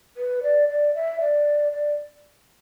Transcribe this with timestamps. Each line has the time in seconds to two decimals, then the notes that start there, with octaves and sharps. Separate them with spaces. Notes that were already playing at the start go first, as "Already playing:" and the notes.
0.17 B4
0.43 D5
0.69 D5
0.95 E5
1.21 D5
1.73 D5